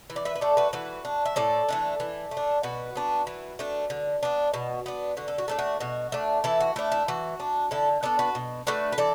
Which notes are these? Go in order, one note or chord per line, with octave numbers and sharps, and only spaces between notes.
E3
D5
B4 E5
B4
A3 D4 A4 D5
F#4 B4
E3 F#4 B4
D4
E5
A2 A4 D5
E3 A3 D4
E3
A3
D4
B2 F#4 B4
B3 D4
E3
A3 D4
D3
B3 D4
B2
B3 D4
D3 F#4
A4
F#4
A3 D4 A4
F#4
B2 F#4
A3 D4
E3 E4 A4
F#4
A3 D4 E4
E4
E3 F#4
D4
D3 E4 A4
B3 D4 A4 D5
F#4 B4
B2
A3 D4 F#4 B4
B4
E3 A4 D5